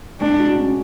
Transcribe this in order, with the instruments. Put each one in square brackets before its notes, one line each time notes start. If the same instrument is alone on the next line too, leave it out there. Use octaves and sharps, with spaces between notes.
[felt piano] G#3 [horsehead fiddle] D4
[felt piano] F#4
C#4